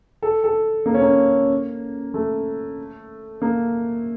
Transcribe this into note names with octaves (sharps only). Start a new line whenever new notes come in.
A4
A4
A#3
C#4
A#3
A3
A#3